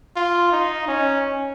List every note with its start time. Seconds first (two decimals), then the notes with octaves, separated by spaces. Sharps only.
0.16 F4
0.52 D#4
0.88 C#4